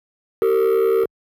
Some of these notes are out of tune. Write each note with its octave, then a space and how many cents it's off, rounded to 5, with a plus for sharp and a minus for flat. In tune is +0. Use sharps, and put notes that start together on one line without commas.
G4 -35 A#4 -45